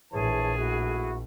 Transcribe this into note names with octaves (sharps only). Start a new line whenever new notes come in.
A#1 E3 G#4 C#5 A5
A3 E4 F#4